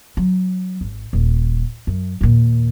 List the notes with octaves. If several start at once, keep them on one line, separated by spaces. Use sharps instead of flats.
F#3
G#1
D#1
F#2
D#2 A#2